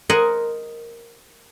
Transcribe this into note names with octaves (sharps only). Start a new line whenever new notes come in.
A#4 C5 D#5 F#5 G#5